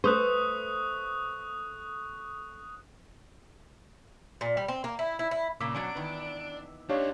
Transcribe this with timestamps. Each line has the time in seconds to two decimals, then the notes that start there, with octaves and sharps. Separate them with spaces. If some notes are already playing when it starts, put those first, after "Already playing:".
0.04 A3 B4 C5 C#6 D#6 F#6
4.41 A#2
4.57 G3
4.68 C4
4.84 A#3
4.99 E4
5.19 E4
5.31 E4
5.60 A#2 C#3 A#3 D6 E6 B6
5.75 B2 F#3 C#4 D4 D7
5.95 D#3 E3 B3
6.89 D4 D#4 F4 G4 C#5 F5